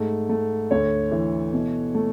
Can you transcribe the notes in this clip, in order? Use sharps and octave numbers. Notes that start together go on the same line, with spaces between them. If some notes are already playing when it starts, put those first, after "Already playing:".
Already playing: G#2 A3
A3
D2 C#5
E3
B2
A3